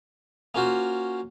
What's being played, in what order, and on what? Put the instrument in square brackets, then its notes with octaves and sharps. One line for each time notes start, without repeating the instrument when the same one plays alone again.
[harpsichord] A#3 C#4 F4 F#4 C5